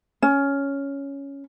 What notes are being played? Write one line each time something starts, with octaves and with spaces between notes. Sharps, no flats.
C#4